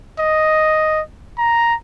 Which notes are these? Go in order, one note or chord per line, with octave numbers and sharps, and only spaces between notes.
D#5
A#5